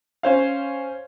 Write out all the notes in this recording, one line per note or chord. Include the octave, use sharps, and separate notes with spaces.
C#4 C5 F5